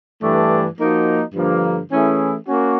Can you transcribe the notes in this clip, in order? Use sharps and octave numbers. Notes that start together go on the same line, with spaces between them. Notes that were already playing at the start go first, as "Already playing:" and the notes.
G2 E3 A3 D4 G4
F3 A#3 D#4 F#4
G2 D3 F3 A#3
E3 A3 C#4 E4 G#4
A#3 C#4 F#4